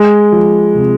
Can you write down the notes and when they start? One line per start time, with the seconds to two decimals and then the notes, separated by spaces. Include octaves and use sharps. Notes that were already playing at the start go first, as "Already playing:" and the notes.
Already playing: G#3
0.32 F3
0.75 C3